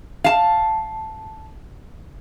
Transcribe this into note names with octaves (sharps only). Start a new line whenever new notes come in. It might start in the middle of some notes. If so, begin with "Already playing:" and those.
F5 A5